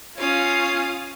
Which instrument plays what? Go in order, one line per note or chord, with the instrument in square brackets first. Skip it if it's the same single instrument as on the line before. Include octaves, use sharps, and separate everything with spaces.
[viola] C#4 F4 [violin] F5 D#6